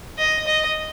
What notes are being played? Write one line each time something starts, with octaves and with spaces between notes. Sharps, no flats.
D#5
D#5